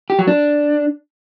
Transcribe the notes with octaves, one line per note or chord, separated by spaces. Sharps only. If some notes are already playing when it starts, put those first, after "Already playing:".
G4
F#3
D4